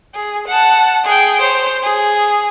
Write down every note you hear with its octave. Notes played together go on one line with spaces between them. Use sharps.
G#4
F#5 A5
G#4 G5
C5 C#5
G#4